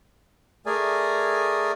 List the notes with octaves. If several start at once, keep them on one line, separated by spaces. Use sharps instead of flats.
A3 G#4 A#4 D5 G#5